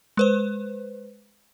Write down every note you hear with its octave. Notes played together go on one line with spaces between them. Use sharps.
G#3 B4 C5